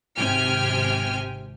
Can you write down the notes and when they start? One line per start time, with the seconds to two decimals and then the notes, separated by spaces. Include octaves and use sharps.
0.17 G#1 C3 G5 G#5 F6